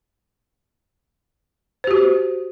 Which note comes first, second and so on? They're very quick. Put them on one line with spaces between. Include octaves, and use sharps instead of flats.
C5 G4 F#4